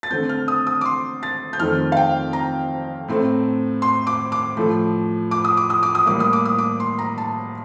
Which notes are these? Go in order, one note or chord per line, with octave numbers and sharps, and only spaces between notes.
A6
D3 A3 C4 G6
F6
D#6
D#6
D6
C6
A6
G6
F2 D#3 A3 C4 F6
F5
G5
A#5
A2 A3 C4
C6
D6
D6
A2 F3 A3
D6
D#6
D6
D#6
D6
D#6
A2 G3 A#3 D6
D#6
D6
D#6
D6
C6
A#5
A5